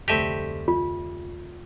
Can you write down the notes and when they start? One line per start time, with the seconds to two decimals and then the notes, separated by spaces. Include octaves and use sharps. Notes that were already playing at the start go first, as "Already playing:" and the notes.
0.08 F1 D2 G3 A3 C4 G4 D#5 E5
0.68 F4